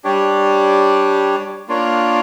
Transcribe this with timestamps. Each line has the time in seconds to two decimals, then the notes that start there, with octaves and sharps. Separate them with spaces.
0.04 G3 D4 G4 C#5
1.68 A#3 D4 F4 C#5